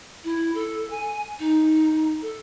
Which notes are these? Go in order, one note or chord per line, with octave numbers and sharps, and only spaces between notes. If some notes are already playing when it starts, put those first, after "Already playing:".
E4
A4
G#5
D#4
A4